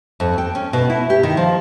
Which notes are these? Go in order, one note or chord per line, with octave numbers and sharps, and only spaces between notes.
F2
G5
C#4
B2
E4
G4
D#3
F3